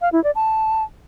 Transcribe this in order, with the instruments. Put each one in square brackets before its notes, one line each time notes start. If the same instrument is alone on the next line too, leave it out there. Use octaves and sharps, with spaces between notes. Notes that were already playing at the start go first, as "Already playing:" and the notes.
[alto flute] F5
E4
D5
A5